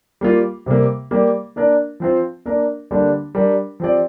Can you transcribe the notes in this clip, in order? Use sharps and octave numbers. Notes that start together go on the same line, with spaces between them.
G3 A#3 F4
C3 G3 A#3
G3 A#3 G4 D5
A#3 D4 A#4 D5
F3 C4 F4 C5
A#3 D4 A#4 D5
D3 G3 A#3 D4
G3 D4 A#4 D5
F3 C4 G4 D5